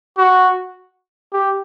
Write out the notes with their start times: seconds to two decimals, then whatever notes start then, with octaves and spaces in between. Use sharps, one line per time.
0.18 F#4
1.33 G4